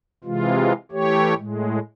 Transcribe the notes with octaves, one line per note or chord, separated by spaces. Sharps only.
C3 E3 G#3 F4
E3 A3 G4 C#5
A2 G#3